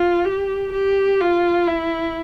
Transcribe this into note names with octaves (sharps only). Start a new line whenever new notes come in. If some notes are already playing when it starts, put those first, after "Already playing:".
Already playing: F4
G4
G4
F4
E4